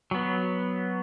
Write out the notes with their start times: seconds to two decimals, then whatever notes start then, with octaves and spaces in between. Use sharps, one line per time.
0.11 F#3 B3